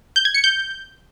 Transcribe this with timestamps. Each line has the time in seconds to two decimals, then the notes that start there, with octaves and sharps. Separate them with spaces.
0.16 G6
0.25 G#6
0.34 C#7
0.44 G6